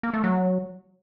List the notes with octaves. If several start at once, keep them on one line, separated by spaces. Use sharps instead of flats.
A#3
A3
F#3